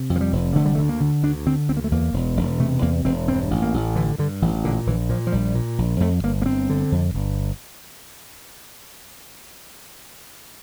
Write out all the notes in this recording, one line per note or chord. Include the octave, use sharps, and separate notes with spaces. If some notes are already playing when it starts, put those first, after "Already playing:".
Already playing: C3
F2
F3
G3
F1
D3 A3
G3
A3
D2
A#3
D3
D2 D4
D3 C4
D2 C4
A#3
A3
E2 A#3
E1
E1
C3 A3
E2 A#3
E1 C4
G2 C4
A1
A#3
A1
D3 E3
G2 D3
A1 E3
A#2 D3
A#1 E3
A#2 F3
F3
A#1 G3
A#2
A#1
F2 A3
G1 A#3
A#3
G1 C4
D3
F2
G1